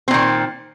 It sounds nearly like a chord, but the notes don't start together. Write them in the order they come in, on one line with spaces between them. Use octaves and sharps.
C4 A#2 D#3